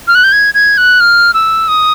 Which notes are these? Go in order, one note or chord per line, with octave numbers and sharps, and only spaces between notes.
F6
F#6
G6
G#6
G#6
F#6
F6
E6
D#6